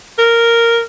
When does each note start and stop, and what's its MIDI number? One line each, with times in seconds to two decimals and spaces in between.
0.18 0.80 70